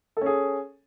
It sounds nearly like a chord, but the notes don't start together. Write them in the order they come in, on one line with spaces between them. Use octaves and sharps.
A4 C#4 G#4